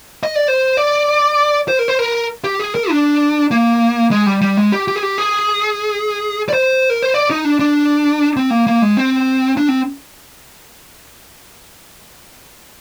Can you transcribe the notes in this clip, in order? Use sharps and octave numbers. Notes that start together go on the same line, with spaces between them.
D#5
D5
C5
D5
C5
A#4
C5
A#4
G4
G#4
A#4
D4
A#3
G#3
G3
G3
G#3
G4
G4
G#4
G4
G#4
D5
C5
A#4
C5
D5
D#4
D4
D4
C4
A#3
A#3
G#3
C4
D4
C4